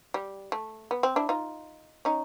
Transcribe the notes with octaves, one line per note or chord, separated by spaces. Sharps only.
G3
A3
B3
C4
D4 E4
D#4 F4
C#4 D#4